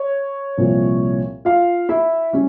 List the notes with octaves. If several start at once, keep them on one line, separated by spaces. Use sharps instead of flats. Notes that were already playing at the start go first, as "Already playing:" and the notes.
Already playing: C#5
C2 A#2 F3
F4 F5
E4 E5
G3 C#4